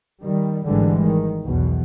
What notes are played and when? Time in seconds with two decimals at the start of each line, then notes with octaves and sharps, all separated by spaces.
0.23 D#3 G3
0.65 G#1 D3 E3 G3 G#3
1.02 D#3
1.43 B1 E2 B2